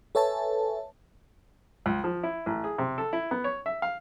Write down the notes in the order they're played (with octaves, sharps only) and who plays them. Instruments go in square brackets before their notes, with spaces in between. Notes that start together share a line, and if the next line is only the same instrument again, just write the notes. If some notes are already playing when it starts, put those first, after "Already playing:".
[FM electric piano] A4 B4 C#5 E5 G#5 A5
[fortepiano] C#2
F3
E4
A1
G#4
C3
A4
E4
B3
C#5
E5
F5